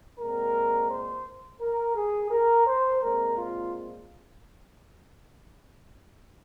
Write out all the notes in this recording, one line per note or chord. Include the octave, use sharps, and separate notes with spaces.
A#2 G#3 C4 A#4
C5
A#4
G#4
A#4
C5
A#2 G#3 C4 A#4
F4